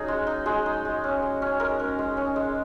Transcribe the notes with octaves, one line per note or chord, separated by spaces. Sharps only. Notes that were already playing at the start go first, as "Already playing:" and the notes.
Already playing: C#4 D#4 F#4 G#4
G#3
D#4
G#3 G#4
D#4
G#3
C#4
G#3
C#4
G#3 A#4
C#4
G#3
C#4
G#3